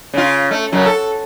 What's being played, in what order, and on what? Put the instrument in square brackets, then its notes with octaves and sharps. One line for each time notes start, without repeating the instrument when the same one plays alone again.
[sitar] C#3 F4
A3
F#2 C#3 F#3
A4